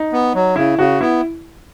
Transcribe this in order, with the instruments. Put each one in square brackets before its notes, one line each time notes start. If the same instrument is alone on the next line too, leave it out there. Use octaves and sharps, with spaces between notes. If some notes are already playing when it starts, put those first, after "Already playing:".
Already playing: [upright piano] D#4
[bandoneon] B3
F#3
[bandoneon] C#3 [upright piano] E4
[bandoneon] C#3 [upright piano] F#4
[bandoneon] B3 [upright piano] E4